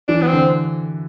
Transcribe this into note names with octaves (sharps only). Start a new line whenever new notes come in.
E3 D4
B3
C4
D3